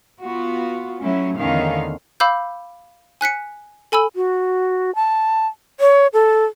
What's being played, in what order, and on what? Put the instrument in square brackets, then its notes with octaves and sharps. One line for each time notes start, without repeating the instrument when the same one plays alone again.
[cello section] B3 F4 F#4
F#3 A3 C#4 E4
E2 D3 D#3 C#4 F5
[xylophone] F5 B5 D6 E6 G6
G#5 F#6 B6 C#7
A4 G#5 B5 E6
[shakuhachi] F#4
A5
C#5
A4